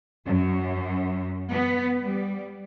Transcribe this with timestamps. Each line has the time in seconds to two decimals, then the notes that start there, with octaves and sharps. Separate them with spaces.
0.25 F#2
1.51 B3
2.02 G3